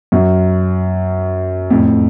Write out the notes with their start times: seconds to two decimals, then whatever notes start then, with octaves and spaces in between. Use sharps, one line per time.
0.12 F#2
1.70 F2 A2